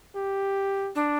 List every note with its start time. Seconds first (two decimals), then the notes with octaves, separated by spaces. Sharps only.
0.15 G4
0.95 D4